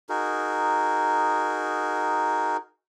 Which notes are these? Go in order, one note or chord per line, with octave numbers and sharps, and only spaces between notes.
D#4 F#4 G#4 A#4